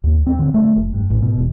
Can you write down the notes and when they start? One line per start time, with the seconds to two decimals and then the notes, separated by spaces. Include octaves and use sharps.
0.04 D#2
0.26 C4
0.39 D3
0.54 A3
0.76 F1
0.94 G2
1.10 A1
1.22 B2
1.38 E1